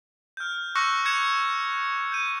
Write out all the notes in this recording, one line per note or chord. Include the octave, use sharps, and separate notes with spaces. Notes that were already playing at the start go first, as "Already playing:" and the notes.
F6 G6
C#6 D6 E6 F#6 A#6 C#7
F#6 G#6 C#7 E7 F7
G6 D#7